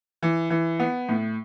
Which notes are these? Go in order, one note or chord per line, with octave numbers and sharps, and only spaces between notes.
E3
E3
B3
A2